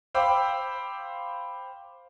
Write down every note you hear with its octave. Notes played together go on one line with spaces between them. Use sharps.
C5 F5 G5 B5 D6 E6